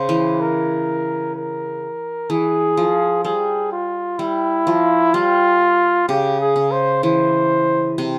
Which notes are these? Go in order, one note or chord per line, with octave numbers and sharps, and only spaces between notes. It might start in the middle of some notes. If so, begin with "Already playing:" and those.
Already playing: C#3 C5
E3
A#4
A#4
E3 G#4
F3
G3 G#4
F4
G3 E4
F3
G3 F4
C#3 G4
G#4
C#3
C5
E3 C5
C3